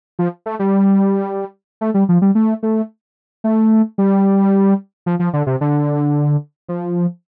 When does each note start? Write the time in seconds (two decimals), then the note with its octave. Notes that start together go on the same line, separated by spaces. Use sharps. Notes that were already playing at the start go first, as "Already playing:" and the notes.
0.19 F3
0.46 A3
0.59 G3
1.81 A3
1.94 G3
2.09 F3
2.22 G3
2.35 A3
2.63 A3
3.44 A3
3.98 G3
5.06 F3
5.19 F3
5.33 D3
5.47 C3
5.61 D3
6.69 F3